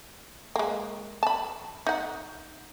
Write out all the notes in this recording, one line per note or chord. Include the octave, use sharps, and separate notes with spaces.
G#3 A#3
A5 B5
D#4 F#5